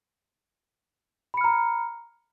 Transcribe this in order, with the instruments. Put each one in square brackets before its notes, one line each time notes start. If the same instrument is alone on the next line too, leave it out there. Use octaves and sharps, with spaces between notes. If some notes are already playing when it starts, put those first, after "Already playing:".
[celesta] B5
C#7
F6
A#5